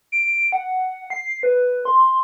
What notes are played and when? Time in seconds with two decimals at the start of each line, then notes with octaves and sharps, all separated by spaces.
0.12 D7
0.52 F#5
1.10 C7
1.43 B4
1.85 C6